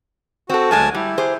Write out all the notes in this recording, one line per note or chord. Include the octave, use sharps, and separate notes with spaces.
C4 F#4 A4
D2 F#3 G#3 A#3 G#5 A5
G3 E4
G4 G#4 C5